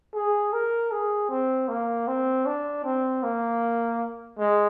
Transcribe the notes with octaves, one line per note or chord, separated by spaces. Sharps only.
G#4
A#4
G#4
C4
A#3
C4
D4
C4
A#3
G#3